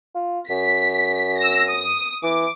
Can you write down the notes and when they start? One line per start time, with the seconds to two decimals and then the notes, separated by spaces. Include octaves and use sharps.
0.15 F4
0.50 F#2 B6
1.38 E6 A#6
1.69 D#6
2.23 E3 D6